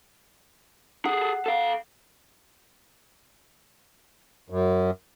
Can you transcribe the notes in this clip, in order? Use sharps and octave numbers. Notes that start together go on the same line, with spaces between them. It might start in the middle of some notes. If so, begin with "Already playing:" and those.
G#4 A4 F#5
A4 F5
F#2